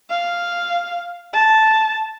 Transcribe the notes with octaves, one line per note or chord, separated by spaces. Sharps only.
F5
A5